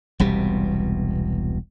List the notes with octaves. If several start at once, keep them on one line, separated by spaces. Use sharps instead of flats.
E1 C2 B2 G3